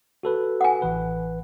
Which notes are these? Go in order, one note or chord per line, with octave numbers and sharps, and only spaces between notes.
F#4 A4 B4
F#5 G#5
A1 E3 B4